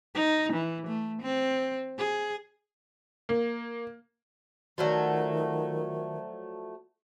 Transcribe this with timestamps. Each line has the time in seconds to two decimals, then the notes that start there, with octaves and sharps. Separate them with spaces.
0.15 D#4
0.53 E3
0.87 A3
1.22 C4
1.98 G#4
3.29 A#3
4.78 D#3 F3 F#3 A3 F#4 D5